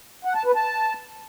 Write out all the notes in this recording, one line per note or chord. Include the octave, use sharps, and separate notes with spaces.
F#5
A5
B4
A5